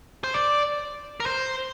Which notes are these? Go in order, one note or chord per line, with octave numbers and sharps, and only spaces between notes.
C5
D5
A#4
C5